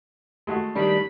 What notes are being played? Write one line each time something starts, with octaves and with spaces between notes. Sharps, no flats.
G#3 A3 F#4
D#3 G3 D4 B5